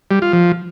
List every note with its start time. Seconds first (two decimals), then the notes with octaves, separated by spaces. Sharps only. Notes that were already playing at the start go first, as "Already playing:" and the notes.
0.11 G3
0.22 F4
0.33 F3